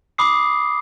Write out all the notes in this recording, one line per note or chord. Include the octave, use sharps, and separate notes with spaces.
B5 D6 D#6 C7